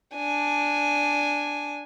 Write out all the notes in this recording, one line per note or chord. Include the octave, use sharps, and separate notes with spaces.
D4 G#5